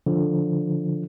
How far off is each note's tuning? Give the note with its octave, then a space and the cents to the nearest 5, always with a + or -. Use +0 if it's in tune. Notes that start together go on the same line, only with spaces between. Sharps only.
D3 +0 F3 +0